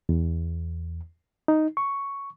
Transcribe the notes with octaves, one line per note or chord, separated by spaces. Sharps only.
E2
D#4
C#6